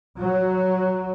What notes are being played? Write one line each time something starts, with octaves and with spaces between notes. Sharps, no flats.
F#3